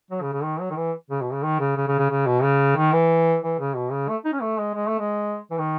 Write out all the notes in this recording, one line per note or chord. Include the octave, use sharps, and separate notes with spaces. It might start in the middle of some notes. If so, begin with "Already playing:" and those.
F#3
C#3
C#3
D#3
F#3
D#3
E3
C#3
B2
C#3
D#3
C#3
C#3
C#3
C#3
C#3
B2
C#3
D#3
E3
E3
C#3
B2
C#3
A3
D#4
C#4
A3
G#3
G#3
A3
G#3
E3
D#3